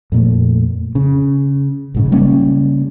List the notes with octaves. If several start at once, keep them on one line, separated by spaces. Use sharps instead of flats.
F2 A#2 A3
C#3
A#1 G#2 C#3
C#3 G3 A#3 C#4